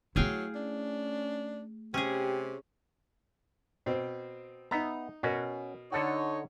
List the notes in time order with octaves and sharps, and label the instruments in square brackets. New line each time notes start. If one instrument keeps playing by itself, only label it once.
[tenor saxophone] F#3 [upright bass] A3 E4 [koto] G#4 F5 G5
[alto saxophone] C#4 [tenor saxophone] D4
[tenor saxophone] C3 [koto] C#4 G#4 [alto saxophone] G4
[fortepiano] B2 C4
[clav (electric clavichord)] B3 E5 [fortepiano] D#4 A#5
[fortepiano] B2 A#4 [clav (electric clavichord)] C#4 F#4
[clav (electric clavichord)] D3 A4 F#5 [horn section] D#4 C#5